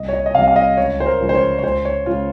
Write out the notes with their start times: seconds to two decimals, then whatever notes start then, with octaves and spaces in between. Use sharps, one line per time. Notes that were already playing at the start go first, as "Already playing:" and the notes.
Already playing: C2 D#5
0.09 C#5
0.13 D#5
0.26 D#5
0.34 C3 G3 F5
0.48 F5
0.56 D#5
0.77 C#2 C#5
1.00 C5
1.06 A#4
1.21 C#3 F3 G#3
1.29 C5
1.35 C#5
1.59 C#5
1.63 C#2 C5
1.85 C#5
2.06 C#3 G#3 F4